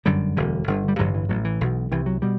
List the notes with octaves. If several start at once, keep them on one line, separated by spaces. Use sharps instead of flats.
G1 F#2 D3 G3
E1 D2 D3
G1 G2 D3
G3
A1 G2 D3 F#3
E3
A1 A2 F#3
E3
B1 B2
C2 C3 E3
F#3
B2 G3